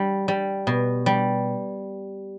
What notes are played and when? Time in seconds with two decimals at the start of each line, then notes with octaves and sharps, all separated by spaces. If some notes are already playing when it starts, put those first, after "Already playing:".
Already playing: G3
0.28 G3
0.67 B2
1.06 G3